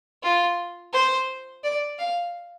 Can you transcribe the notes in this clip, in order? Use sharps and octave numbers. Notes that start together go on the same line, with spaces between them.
F4
C5
D5
F5